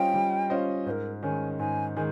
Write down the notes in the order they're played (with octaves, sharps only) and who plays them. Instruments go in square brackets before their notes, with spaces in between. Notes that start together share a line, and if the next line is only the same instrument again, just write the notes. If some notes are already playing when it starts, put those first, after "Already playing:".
Already playing: [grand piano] G3 C#4 F4 C5 D#5 [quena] G5
[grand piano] G3
C#4 F4 C5 D#5
[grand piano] G#2 [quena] C5
[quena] A#4
[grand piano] D#3 G#3 C#4 [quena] G#5
[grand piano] G#2 [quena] G#5
[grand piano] D#3 G#3 [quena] G#5